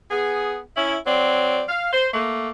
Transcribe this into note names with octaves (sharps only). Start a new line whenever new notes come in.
B3 G#4
C#4 E4
F#3 C4 D5
F5
C5
A3 A#3